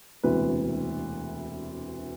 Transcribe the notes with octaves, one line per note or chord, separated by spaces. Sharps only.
E1 D2 C3 E3 B4